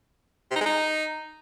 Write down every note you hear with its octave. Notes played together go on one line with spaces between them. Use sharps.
C3
D#4
G#3
D#4